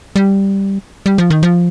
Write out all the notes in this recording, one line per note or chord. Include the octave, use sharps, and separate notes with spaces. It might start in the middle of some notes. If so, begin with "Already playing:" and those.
G3
G3
F3
D#3
F3